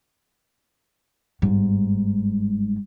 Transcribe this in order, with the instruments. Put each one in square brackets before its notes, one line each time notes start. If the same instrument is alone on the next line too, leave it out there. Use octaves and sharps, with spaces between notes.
[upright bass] G1 G#2